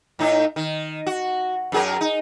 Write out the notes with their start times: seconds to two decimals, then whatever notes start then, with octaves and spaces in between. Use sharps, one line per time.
0.19 A2 D#4
0.56 D#3
1.06 F#4
1.72 F#2 G#4 A#4
2.01 D#4